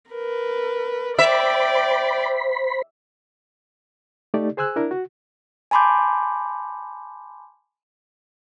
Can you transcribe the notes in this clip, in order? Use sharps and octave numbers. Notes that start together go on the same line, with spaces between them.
A#4 B4
C5 D5 E5 G5 B5
A3 D#4 G4 D5
G#4 C5 G#5 E6 F#6
D4 E4 A#4
F#4
G#5 A5 B5 C6 D6 G6